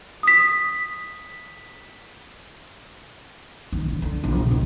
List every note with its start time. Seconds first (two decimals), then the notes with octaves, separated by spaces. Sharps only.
0.23 D#6 B6
3.72 D#3
3.88 D3
4.02 D3
4.24 A#1
4.35 C#3
4.51 C#2